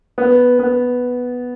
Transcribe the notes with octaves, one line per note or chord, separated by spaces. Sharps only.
B3
B3